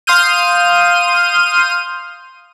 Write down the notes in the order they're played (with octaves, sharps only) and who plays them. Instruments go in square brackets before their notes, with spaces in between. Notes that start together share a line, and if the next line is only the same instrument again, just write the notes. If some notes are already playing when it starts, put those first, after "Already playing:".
[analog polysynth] F5 C6 D#6 F6 G6 D#7